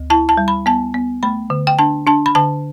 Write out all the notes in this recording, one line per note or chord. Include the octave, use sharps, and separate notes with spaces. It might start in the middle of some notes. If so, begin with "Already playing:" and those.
Already playing: D2
E4 A5
A5
G3
B5
B3 A5
B3
A3 B5
D3
G5
D4 A5
D4 A5
B5
D3 A5